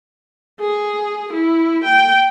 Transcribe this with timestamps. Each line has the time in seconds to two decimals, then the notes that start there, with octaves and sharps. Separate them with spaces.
0.60 G#4
1.33 E4
1.84 G5